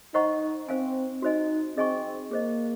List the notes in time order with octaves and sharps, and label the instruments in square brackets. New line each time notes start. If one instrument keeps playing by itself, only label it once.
[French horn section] D#4 [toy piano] C5 D#5 F#5 A#5 C#6
[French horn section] C4 [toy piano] C5 F5 G#5
[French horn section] D#4 [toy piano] F#4 C5 D#5 G#5
[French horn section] C4 [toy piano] G#4 D#5 G#5 C#6
[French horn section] A#3 [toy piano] G#4 C5 D#5